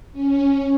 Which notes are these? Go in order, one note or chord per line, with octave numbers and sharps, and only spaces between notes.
C#4